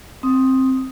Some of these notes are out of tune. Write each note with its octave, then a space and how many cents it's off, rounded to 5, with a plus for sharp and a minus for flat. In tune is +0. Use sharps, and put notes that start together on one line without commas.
C4 +10 D#6 +0